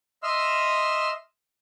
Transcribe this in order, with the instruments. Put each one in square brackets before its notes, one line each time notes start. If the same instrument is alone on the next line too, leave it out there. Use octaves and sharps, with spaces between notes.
[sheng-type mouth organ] D#5 E5 C6 E6 F6